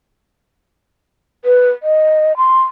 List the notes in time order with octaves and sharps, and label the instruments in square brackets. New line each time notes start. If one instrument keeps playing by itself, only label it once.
[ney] B4
D#5
C6